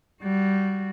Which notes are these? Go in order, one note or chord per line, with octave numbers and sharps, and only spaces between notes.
G3 F#4